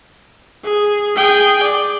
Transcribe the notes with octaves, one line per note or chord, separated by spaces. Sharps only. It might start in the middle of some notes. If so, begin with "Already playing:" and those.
G#4
G#4 G5
D5